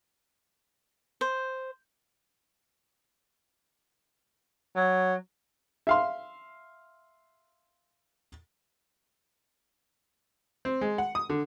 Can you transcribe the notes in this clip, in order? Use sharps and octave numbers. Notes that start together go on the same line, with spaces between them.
C5
F#3
E5 F5 C6
C4
G#3
F#5
D#6
D3